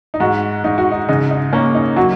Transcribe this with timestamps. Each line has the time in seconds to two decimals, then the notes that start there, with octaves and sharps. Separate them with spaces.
0.14 D#4
0.20 G#2 F#4
0.64 G#2 D#4
0.78 F#4
0.92 D#4
1.08 C#3 D#4
1.31 D#4
1.53 A#3 C#4
1.75 D#4
1.96 F#3 F#4